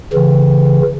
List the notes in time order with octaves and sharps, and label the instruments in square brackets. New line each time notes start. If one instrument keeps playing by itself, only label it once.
[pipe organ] C#3 E3